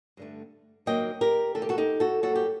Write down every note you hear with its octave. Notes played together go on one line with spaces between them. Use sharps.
G2 D3 A3
G2 D#3 F#3 A#3 D#5 G5
G4 A#4
C3 D#3 A3 A4
G4
F#4 A4
D#4 G4
F#4 A4
G2 F#3 A#3 F#4 A4
G4